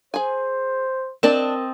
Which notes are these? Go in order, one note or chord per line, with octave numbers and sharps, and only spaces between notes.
G#4 C5 G#5
C4 D4 A#4 D5 D#5 A5 E7